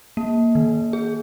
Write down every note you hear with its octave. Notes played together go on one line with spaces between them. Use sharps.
A#3
D#3
G#4